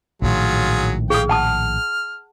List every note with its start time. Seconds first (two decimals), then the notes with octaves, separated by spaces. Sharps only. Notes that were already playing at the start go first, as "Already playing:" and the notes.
0.22 A#1 A2 D#3 F#3 F4 G#4
1.10 G4 G#4 F5 G5 D#6
1.29 F#5 A5 D#6 F6